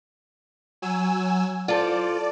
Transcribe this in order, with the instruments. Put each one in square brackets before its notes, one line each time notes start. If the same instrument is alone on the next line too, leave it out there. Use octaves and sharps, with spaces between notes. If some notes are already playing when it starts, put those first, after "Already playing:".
[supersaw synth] F#3 G#5 E6
[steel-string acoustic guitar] F4 A4 C5 [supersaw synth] D5